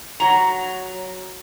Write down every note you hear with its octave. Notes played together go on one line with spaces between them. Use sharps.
F#3 A#5